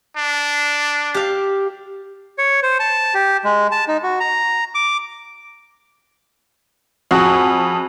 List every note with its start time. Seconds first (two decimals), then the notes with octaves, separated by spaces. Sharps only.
0.17 D4
1.14 G4 F5
2.38 C#5
2.63 C5
2.80 A5
3.14 G4
3.44 G#3
3.71 A5
3.88 D#4
4.03 F#4
4.20 A#5
4.75 D6
7.11 F2 F#4 G#4